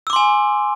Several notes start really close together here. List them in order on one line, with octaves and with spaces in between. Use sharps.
E6 D6 C6 G#5